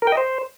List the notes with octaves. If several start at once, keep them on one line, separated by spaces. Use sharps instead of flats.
A#4
G5
D#5
C5